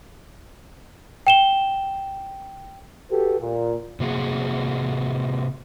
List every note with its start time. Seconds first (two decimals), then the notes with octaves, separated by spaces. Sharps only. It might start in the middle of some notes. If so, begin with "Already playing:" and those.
1.27 G5 E7 G7
3.10 F#4 G4 A4 B4
3.41 A#2
4.00 C3 A#3 F#4 G#4